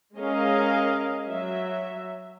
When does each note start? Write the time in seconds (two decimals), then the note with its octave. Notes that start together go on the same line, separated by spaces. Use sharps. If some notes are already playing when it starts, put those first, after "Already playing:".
0.17 G#3 C#4 G#4 A#4 D#5 F5
1.27 F#3 E5